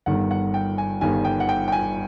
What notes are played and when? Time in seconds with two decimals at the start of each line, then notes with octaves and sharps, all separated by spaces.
0.06 G1 G2 D#3 F#5
0.31 F#5
0.54 G5
0.78 G#5
1.01 G1 G2 D#3 G#5
1.25 G5
1.40 F#5
1.49 G5
1.68 G5
1.72 G#5